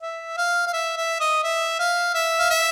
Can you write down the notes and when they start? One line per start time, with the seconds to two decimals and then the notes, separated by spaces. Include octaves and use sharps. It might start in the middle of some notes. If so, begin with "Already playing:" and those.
0.02 E5
0.37 F5
0.67 F5
0.73 E5
0.97 E5
1.20 D#5
1.44 E5
1.79 F5
2.14 E5
2.39 F5
2.50 E5